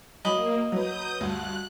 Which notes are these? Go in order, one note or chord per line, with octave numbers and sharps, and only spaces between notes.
F#3 A#3 D#5 B5 D6
F#3 B4 D#6 G6
D2 G2 F#6